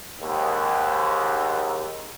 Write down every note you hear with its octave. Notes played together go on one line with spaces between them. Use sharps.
D#2 G#2